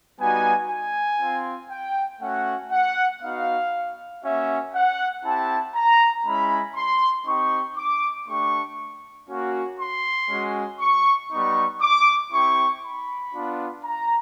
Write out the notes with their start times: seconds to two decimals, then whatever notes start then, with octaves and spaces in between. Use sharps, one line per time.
0.19 G3 B3 D#4 F#4 G#5
0.70 G#5
1.20 C4 F4
1.70 G5
2.21 A3 C#4 F#4 F#5
2.72 F#5
3.22 B3 D#4 F#4 F5
4.23 A#3 C#4 F#4 E5
4.74 F#5
5.24 C4 E4 G4 A5
5.75 A#5
6.25 G#3 C#4 E4 B5
6.76 C6
7.26 C4 D#4 G4 C#6
7.76 D6
8.27 A3 D4 G4 C#6
9.29 A#3 C#4 F#4
9.79 C6
10.30 G#3 C#4 F#4
10.80 C#6
11.31 G3 B3 D#4 C#6
11.81 D6
12.32 C4 E4 G4 C#6
12.83 B5
13.33 B3 D4 F4
13.84 A#5